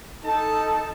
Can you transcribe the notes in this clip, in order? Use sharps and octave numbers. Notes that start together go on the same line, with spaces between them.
D#4 A4 A5